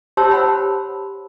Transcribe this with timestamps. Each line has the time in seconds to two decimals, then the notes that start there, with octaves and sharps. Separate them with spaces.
0.17 G4 C5 C#5 A5 C6 E6
0.31 C5 F#5 B5